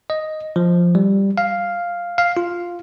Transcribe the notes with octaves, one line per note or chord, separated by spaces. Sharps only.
D#5
F3
G3
F5
F5
F4